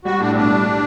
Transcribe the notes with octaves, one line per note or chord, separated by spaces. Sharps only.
G3 F#4
A2 D4
C4
B1 D4
G3
G3